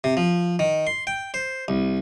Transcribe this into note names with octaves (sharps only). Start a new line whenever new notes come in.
C3
F3
D#3
C6
G5
C5
C2